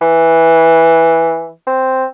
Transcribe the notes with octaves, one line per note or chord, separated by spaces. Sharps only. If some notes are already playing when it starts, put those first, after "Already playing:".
E3
C4